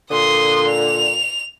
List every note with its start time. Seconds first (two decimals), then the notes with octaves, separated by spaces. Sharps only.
0.11 A#2 D3 C6 D#6
0.68 F7